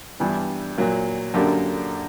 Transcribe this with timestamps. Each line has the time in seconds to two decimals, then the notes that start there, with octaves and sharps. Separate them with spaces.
0.20 G2 E3 G3 B3 D4
0.78 A#2 F#3 A#3
1.34 F#2 D3 A#3 D4 G4